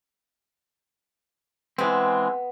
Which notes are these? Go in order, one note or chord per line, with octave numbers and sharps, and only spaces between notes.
E3 G#3 B3 C4